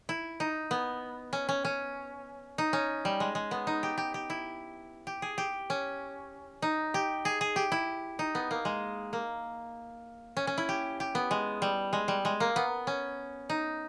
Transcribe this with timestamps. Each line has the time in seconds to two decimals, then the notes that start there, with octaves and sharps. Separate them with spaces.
0.09 E4
0.40 D#4
0.71 B3
1.33 C#4
1.49 C#4
1.65 C#4
2.58 D#4
2.73 C#4
3.05 G3
3.20 G#3
3.35 G#3
3.51 B3
3.67 D#4
3.83 G4
3.98 G4
4.14 G4
4.30 E4
5.07 G4
5.22 G#4
5.38 G4
5.70 C#4
6.62 D#4
6.94 G4
7.25 G#4
7.41 G#4
7.56 G4
7.72 E4
8.19 D#4
8.35 B3
8.51 A#3
8.65 G#3
9.13 A#3
10.37 C#4
10.47 C#4
10.58 E4
10.69 G4
11.00 G4
11.15 B3
11.31 G#3
11.62 G3
11.93 G#3
12.08 G3
12.25 G#3
12.40 A#3
12.56 B3
12.87 C#4
13.49 D#4